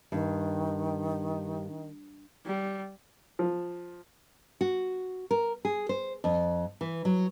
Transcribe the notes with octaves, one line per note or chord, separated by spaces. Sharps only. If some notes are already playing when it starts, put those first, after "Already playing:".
G2 D#3
G3
F3
F#4
A#4
G#4
C5
F2
E3
F#3